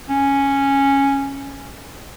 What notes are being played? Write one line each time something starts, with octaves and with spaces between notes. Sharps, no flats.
C#4